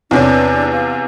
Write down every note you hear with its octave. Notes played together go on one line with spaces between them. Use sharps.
E2 C3 C#4 D4
F5